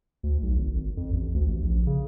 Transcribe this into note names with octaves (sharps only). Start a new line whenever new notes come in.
D2
B1
G#1
G#1
F2
A1
D2
A1
A#1
C#3